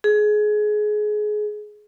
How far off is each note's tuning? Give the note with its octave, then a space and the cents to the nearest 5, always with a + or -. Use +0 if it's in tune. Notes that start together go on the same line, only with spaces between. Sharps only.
G#4 +25